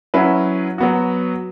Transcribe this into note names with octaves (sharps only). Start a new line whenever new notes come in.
F#3 C#4 E4 B4
F#3 B3 F#4